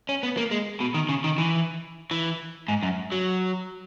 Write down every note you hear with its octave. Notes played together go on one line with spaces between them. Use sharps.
C#4
B3
A#3
G#3
B2
D#3
C#3
D#3
E3
E3
G#2
F#2
F#3